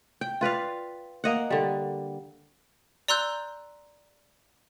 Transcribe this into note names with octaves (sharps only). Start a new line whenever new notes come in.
G5
F4 B4 D5 F5
A#3 D#5 F#5
D3 G3
D5 A#5 C6 E6 F#6 G6